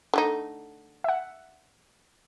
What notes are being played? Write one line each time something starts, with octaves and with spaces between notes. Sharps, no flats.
D3 A3 D#4
E5 F#5